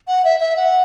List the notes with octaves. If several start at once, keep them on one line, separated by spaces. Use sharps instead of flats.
F#5
E5
E5
F#5